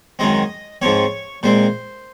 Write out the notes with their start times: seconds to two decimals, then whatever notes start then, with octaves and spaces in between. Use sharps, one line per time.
0.19 F#2 D#3 G#3 C4 D#5
0.82 G#2 F3 C4 C#5
1.43 A#2 G#3 C4 C5